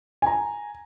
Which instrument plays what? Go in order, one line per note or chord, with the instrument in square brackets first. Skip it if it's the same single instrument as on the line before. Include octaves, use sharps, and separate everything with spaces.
[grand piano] G#5 A#5